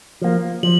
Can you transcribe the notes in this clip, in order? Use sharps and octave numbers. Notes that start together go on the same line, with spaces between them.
F3 A#3
F3 F#7